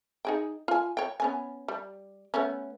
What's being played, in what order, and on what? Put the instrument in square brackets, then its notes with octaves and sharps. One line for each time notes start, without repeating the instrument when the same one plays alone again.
[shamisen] D#4 G#4 G5
F4 G#5
C#5 G5
B3 C#4 G#5
G3
A3 B3 C#4